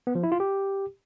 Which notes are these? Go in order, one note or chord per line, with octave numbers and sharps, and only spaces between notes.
B3
F3
E4
F4
G4